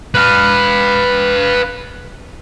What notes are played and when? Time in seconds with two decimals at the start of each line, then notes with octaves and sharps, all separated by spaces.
0.15 B4 F5